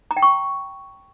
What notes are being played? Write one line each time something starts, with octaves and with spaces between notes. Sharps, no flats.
A#5
G5
C#6